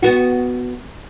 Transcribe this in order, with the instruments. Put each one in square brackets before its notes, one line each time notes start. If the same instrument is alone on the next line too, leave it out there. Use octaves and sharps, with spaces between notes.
[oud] B3 F#4